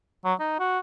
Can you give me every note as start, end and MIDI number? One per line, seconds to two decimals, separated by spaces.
0.25 0.34 54
0.40 0.59 63
0.60 0.79 66